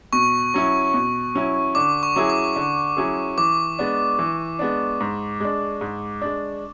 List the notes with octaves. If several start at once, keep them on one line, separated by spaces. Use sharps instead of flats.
B2 C#6
F#3 C#4 E4
B2
F#3 C#4 E4
D3 D6
C#6
F#3 C#4 E4 G#4
D6
D3
F#3 C#4 E4 G#4
E3 D6
G#3 B3 D4
E3
G#3 B3 D4
G#2
G#3 D4
G#2
G#3 D4